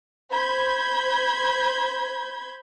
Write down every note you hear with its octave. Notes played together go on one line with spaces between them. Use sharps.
C5 B5 G6 G#6